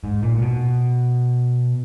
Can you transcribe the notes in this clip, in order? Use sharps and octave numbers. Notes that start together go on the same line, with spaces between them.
G#2
A#2
A#2
B2